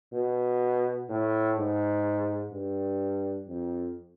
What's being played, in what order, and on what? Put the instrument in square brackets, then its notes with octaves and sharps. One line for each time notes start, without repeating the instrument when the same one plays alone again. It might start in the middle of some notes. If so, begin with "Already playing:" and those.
[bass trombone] B2
A2
G#2
G2
F2